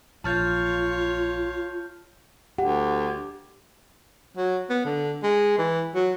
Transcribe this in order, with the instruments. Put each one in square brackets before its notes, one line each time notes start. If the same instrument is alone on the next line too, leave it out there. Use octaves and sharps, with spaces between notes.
[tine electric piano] A#1 A6 [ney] F4 [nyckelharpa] C#5 F5 [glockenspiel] A5 F6 G6
[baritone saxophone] D2 [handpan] G4 [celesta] F#5
[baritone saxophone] F#3
B3
D3
G#3
E3
F#3